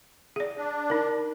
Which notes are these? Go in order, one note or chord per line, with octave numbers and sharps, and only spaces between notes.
G#4 D5
D4
D#4 A#4